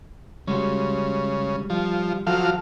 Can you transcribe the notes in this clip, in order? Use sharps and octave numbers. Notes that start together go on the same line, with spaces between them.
C#3 G3 G#3 F#4
F3 G3
F3 F#3 A4 F5